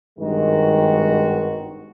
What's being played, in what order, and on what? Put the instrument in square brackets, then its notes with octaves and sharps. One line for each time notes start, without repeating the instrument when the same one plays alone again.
[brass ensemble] G#1 G2 B2 D#3 G#3 F#4